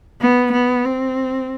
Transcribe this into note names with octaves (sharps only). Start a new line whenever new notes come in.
B3
B3
C4